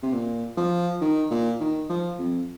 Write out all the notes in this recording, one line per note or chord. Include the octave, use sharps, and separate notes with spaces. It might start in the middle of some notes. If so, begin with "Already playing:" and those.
C3
A#2
F3
D#3
A#2
D#3
F3
F2